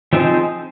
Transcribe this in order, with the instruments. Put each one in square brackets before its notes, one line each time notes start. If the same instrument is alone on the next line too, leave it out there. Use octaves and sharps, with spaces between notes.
[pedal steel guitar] F3 C4 D#4 G#4 C5